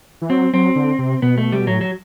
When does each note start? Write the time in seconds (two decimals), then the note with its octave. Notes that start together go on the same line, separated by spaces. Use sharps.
0.22 E3
0.30 F#3 C4
0.54 F#3 C4
0.76 D3
0.99 C3
1.22 B2 B3
1.38 A3
1.52 C3 G3
1.60 B2
1.67 A2 F#3
1.81 F#3